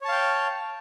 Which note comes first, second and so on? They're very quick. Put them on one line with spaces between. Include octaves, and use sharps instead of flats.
C#5 A5 F5 G5